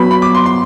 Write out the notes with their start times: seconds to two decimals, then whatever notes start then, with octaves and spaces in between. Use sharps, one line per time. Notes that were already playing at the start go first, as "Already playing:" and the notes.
Already playing: F#3 B3 F#4 B5
0.11 B5
0.22 D6
0.35 C6
0.46 C6